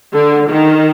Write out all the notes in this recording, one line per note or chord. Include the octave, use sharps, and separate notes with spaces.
D3
D#3